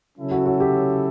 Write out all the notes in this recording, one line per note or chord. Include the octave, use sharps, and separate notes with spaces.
C#3 F#3 C#4 E4 A4
F#4
F#4
G4